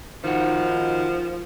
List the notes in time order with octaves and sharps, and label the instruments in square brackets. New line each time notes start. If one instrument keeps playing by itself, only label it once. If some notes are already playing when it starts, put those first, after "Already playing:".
[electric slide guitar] D#3 F#4 [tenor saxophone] F3 [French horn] D#4